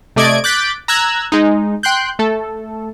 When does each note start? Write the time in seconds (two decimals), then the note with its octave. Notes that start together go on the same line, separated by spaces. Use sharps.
0.16 C3 A3 D5 D#5 G#6 D7
0.44 D6 F#6 G6 A6 B6 D7
0.88 A#5 E6 F#6 G#6
1.32 G#3 D#4
1.83 G5 C6 F#6 G6
2.19 A3 A4